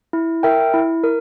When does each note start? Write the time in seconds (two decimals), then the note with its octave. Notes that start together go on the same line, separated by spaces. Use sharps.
0.13 E4
0.43 A#4 E5 G5
0.74 E4
1.04 A#4